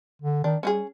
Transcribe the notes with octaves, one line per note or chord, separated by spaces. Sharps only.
D3
D#3 D4
G3 C#4 E4 G#4